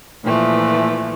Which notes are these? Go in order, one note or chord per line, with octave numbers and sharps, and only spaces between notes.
A#2 E3 F3 A3